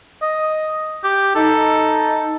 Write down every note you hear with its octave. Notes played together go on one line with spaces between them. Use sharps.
D#5
G4
D#4 A4